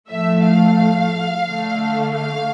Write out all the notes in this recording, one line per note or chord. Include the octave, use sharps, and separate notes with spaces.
A2 F3 A3 E5
F5
D3 A3
F5